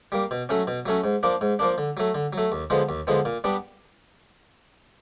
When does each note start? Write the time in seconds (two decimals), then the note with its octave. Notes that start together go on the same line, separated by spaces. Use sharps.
0.12 G3 A#3
0.31 B2
0.49 F#3 A3 C#4
0.67 B2
0.86 F#3 A3 C#4
1.04 G#2
1.23 F3 A#3 D4
1.41 G#2
1.59 F3 A#3 D4
1.78 D3
1.97 F#3 A3
2.15 D3
2.33 F#3
2.38 A3
2.52 D#2
2.70 D3 F3 G#3 B3
2.89 D#2
3.07 D3 F3 G#3 B3
3.25 A#2
3.44 G3 B3 D4